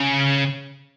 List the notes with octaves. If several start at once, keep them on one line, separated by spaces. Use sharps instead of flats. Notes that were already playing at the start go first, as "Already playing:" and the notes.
Already playing: C#3